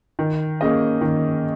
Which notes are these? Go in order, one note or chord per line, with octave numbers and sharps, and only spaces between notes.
D#3
A#3 C#4 G#4 D#5
D#3